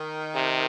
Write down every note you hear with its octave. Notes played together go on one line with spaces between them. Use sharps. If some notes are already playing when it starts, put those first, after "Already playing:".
Already playing: D#3
C3